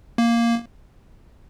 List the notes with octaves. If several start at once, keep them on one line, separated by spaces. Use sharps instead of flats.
A#3